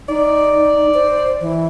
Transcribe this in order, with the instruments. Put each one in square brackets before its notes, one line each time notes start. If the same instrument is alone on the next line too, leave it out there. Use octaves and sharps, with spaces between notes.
[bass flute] D#4 [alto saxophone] D5
[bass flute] C5
E3